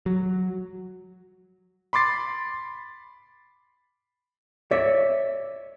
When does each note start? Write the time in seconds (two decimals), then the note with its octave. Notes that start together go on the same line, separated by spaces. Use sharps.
0.06 F#3
1.93 B5 C6 D6 A6 C7
4.71 C#5 D5 E5